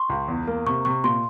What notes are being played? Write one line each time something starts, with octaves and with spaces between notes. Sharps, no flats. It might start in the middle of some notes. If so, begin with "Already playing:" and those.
Already playing: C6 C#6
C#2
E2
A#3
C3 C#6
C3 C#6
A#2 C6